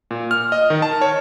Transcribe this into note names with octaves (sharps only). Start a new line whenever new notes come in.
A#2
F6
D#5
D#3
A5
C#5